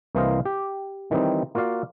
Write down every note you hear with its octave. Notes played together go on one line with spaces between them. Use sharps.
C2 E3 A#3 C5 D#5 F5
G4
D#3 E3 G3 C4 D#4
A#3 F4 F#4 D5 F5